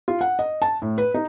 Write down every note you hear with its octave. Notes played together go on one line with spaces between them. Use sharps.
F4
F#5
D#5
A5
A2
B4
D#4